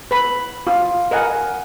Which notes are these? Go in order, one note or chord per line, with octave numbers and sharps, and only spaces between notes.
B4 B5
F4
A#4 D#5 F#5 G#5